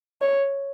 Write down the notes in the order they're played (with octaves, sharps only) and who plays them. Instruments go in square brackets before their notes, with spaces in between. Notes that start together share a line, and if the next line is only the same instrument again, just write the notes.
[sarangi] C#5